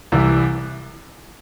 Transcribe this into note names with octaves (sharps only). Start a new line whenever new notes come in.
C2 C3 E3 G3 E4